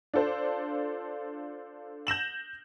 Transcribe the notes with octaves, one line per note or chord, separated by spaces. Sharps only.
D4 F4 A4 C5
G6 A#6 E7 F#7